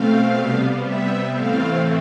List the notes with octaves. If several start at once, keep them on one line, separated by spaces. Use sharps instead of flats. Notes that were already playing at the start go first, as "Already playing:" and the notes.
Already playing: B2 A3 C4 F5
C3 G3 B3
E5
A2 E3 A3 C4 F5